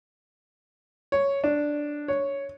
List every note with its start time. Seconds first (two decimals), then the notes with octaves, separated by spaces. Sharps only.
1.12 C#5
1.44 D4
2.08 C#5